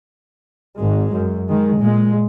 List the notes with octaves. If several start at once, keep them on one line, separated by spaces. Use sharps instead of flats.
G#1 G#3
F#2
D#3 G#3
A#2 G#3